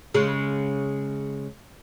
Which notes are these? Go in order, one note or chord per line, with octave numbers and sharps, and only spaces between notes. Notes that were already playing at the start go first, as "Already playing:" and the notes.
C#3 G#3